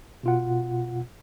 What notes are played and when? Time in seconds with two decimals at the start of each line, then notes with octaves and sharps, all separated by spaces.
0.23 B2 F4 F#5